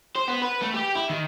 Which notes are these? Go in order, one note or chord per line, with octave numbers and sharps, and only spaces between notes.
C5
B3
B4
A3
G4
E4
D#3